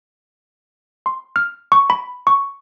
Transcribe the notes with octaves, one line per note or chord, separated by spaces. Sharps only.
C6
F6
C#6
B5
C#6